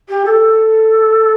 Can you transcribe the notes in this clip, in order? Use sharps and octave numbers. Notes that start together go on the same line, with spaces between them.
G4
A4